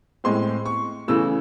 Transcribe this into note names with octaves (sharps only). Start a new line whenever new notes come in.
A2 G#3 C4 C6
C#6
C#3 E3 A3 E6